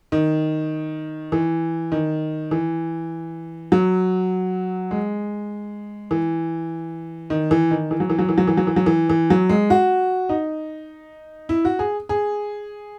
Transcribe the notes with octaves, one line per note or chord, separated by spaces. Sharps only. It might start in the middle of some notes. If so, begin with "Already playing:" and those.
D#3
E3
D#3
E3
F#3
G#3
E3
D#3
E3
D#3
E3
F#3
E3
F#3
E3
F#3
E3
F#3
E3
F#3
E3
E3
F#3
G#3
F#4
D#4
E4
F#4
G#4
G#4